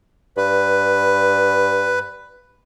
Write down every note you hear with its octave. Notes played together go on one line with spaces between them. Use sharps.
G2 B4